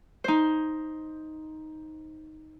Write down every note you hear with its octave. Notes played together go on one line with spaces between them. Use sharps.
D#4 C5